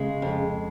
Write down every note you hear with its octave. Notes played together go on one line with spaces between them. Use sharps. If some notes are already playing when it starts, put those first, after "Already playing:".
Already playing: C#3 G#3
F2